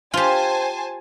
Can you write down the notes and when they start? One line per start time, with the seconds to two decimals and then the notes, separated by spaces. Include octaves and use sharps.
0.14 F4 G4 C5 G#5 A5